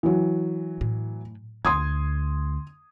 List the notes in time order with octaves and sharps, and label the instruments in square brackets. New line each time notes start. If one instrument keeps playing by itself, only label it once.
[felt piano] E3 F#3
[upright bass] A2
[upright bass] D2 [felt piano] C6 D#6 G#6